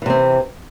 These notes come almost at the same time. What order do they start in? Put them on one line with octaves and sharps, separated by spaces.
E3 C3 C4